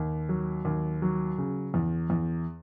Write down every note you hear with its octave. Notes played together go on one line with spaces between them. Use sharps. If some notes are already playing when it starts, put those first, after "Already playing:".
Already playing: D#2
F#3
D#2
F#3
C#3
E2
E2